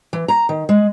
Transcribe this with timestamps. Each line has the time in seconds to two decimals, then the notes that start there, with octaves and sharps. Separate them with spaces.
0.13 E3
0.28 A#5
0.49 D#3
0.69 G#3